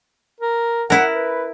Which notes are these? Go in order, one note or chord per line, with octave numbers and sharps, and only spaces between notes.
A#4
E4 A#4 F#5
B4